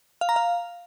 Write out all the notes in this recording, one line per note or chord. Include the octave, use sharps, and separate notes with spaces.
F5
A#5
F5